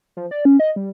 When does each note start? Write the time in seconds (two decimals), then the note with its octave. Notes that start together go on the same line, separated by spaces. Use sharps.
0.17 F3
0.31 D5
0.45 C#4
0.59 D#5
0.76 G3